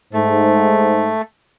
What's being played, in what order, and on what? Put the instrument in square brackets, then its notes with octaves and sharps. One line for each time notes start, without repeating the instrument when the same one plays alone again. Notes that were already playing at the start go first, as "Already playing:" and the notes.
[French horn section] G#2 C5 [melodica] A3